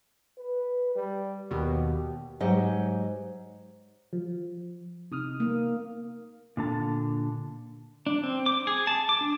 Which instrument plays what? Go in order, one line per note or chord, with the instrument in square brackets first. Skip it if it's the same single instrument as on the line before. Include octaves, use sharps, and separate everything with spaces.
[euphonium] B4
G3
[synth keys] D#2 B2 [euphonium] G4
[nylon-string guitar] G#2 F#3 G4 D#5
[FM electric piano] F3
[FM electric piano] C3 D#6 F6 [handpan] D#4
[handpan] A#3
[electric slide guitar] A#2 D3 A5
[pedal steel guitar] D4
C4
D6
G#4
A5
D6
D4